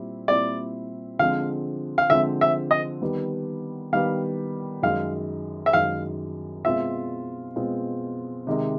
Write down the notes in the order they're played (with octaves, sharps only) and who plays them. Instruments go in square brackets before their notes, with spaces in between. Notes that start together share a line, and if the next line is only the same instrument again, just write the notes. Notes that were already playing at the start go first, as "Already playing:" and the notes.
Already playing: [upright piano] A#2 G3 C4 E4
[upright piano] A#2 G3 C4 E4 [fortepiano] D5
[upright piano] D3 F3 G#3 C4 [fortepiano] F5
[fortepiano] F5
[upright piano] D3 F3 G#3 C4 [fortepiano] E5
[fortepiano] E5
D#5
[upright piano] D#3 G3 B3
[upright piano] D#3 G3 B3 [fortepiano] F5
[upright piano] F#2 D#3 G#3 [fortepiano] F5
[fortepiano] E5
[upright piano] F#2 D#3 G#3 [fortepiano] F5
[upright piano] B2 G#3 C4 F4 [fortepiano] E5
[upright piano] B2 G#3 C4 F4
C3 D#3 G#3